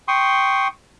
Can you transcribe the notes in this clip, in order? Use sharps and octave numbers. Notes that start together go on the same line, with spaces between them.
G5 C6 C#6 D#6